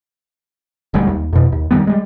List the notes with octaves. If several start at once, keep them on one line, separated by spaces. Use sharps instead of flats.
D#1 D2 G3 G#3
D#2
F2 B2
D#2
D#3 E3 G3 B3
G3 G#3